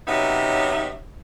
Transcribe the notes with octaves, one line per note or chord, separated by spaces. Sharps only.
C3 F#3 B3 C#4 D#4 E5